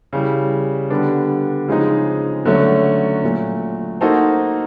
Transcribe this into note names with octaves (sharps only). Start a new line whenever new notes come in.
C#3 E3 G3
D3 G3 B3 D4
C#3 F3 G#3 C4 D#4
D3 F#3 A3 C#4
A#2 F#3 A3
A#3 D#4 F#4 A4 C5